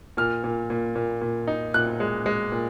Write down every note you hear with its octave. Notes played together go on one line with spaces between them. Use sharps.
A#2 F6
A#2
A#2
A#2
A#2
D#4
A#2 F#6
G#3
G#3
A#2